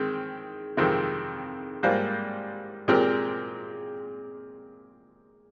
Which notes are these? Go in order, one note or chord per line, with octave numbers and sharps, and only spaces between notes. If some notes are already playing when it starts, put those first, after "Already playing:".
Already playing: D#3 G#3 C4
F2 C3 D#3 G#3 C4
G#2 G3 A#3 F4 C5
A#2 G#3 C4 G4 A#4